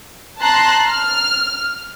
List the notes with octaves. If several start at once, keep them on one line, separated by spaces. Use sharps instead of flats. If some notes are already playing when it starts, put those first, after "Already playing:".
A5 A#5 C6 F#6
F6